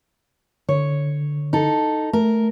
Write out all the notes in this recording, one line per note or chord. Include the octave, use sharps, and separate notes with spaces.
D3 C#5
D#4 A4
A3 A#4